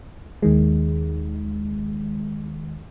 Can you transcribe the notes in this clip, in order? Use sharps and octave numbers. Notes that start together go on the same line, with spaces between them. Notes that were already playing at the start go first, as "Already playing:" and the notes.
D#2 D#3 G#3